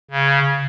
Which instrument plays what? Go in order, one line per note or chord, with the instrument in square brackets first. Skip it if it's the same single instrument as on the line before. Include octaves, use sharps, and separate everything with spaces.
[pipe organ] C#3